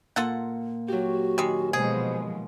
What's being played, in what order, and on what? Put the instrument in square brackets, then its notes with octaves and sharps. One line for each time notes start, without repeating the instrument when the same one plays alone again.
[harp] A#2 [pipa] F4 A4 F#5
[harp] F#3 G4 [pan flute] F#4
[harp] D#3 [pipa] G3 G#3
[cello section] B2 F3 G#3 [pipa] G#4 [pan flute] C5